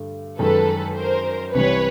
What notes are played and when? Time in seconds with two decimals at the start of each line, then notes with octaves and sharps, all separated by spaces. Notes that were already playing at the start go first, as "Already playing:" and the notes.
Already playing: G2 D3 A3
0.38 F#2 D#3 G#3 A4 B4
0.96 A#4 C5
1.54 C2 C3 E3 G3 B4 C#5